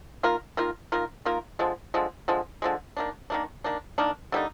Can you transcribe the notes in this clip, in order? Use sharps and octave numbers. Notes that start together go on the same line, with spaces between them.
D#3 A#3 F4 A#4
D#3 A#3 F4 A#4
D#3 A#3 F4 A#4
D#3 A#3 F4 A#4
D3 F3 G#3
D3 F3 G#3
D3 F3 G#3
D3 F3 G#3
D#3 A#3 D4
D#3 A#3 D4
D#3 A#3 D4
D#3 A#3 D4
D3 G3 A#3 D#4